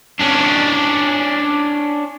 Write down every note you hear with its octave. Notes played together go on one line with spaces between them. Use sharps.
C#4 D4